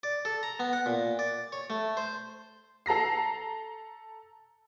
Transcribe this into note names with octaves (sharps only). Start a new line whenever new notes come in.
D5
A4
A#5
B3
F#5
A#2
D5
C#5
A3
C5
A4 A#5 A#6 C7